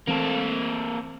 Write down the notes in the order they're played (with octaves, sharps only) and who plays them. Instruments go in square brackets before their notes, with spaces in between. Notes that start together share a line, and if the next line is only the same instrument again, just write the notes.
[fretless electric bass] E3 A3 C4 [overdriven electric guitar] A#3 A4